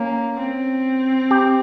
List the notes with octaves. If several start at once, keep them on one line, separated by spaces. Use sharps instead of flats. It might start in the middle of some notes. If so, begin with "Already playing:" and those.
Already playing: A#3 C#4
C4
G4